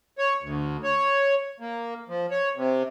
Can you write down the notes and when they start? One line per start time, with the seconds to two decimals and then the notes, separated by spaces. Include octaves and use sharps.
0.18 C#5
0.43 D2
0.84 C#5
1.60 A#3
2.09 F3
2.31 C#5
2.56 C3